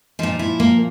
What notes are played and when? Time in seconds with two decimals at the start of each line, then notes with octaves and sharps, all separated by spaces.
0.19 A#2 F3 D#4
0.39 E4
0.60 A#3